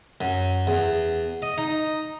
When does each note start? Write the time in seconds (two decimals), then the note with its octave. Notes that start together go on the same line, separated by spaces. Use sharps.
0.21 F#2
0.67 E2
1.42 D#5
1.58 D#4